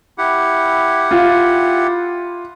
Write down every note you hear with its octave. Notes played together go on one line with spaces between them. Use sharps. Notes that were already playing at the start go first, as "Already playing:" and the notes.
E4 G4 F#5
F4